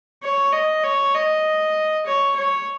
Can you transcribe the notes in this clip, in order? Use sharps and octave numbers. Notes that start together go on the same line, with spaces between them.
C#5
D#5
C#5
D#5
C#5
C#5